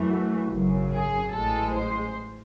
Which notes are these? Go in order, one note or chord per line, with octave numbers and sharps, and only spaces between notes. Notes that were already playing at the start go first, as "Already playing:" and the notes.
Already playing: F#2 E3 A3
F#4
G#1 F#2 C#3 F#3
G#4
A1 A2 G#3 A4
C5